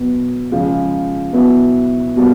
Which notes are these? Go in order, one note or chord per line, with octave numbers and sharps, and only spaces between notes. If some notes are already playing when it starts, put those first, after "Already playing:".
Already playing: B2 F#3 B3
C#3 F3 G#3
B2 F#3 B3 E4
B2 G3 A#3